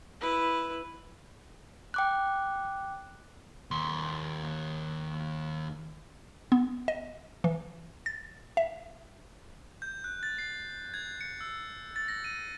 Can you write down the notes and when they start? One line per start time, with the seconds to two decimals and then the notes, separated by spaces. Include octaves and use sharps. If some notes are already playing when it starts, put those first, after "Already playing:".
0.21 E4 B4
1.94 G5 D6 F#6
3.71 D#2 C6
6.52 B3
6.88 D#5
7.44 E3
8.06 A6
8.57 E5
9.82 G6
10.04 F#6
10.23 A6
10.38 C7
10.94 G#6
11.21 C#7
11.41 E6
11.96 A6
12.08 A#6
12.24 D#7